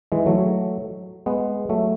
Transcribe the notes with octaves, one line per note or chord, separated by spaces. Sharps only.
E3 G#3
F#3 A3
G#3 B3
F#3 A3